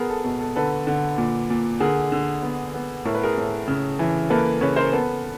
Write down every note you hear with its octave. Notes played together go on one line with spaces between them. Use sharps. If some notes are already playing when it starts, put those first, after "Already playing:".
Already playing: B3 G#4 A#4
A4
B2 A4
A4
D3 A4 B4
D3
A#2
A#2
D3 G#4 A#4
D3
B3
B3
A2 A#4
B4
G#4 A#4
A2
C#3
E3
A#3 A4 B4
C#3 B4 C#5
A#4 C5
B3 A4 B4